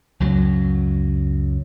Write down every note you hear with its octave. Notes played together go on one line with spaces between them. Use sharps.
C#2 F#2 F#3